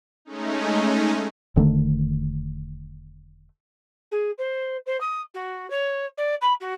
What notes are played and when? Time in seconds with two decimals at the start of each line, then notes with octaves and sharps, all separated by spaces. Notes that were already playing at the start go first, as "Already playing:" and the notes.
0.25 G#3 A3 C#4 D#4
1.56 E1 D3 D#3 A3
4.11 G#4
4.38 C5
4.86 C5
5.00 D#6
5.34 F#4
5.70 C#5
6.17 D5
6.41 B5
6.60 F#4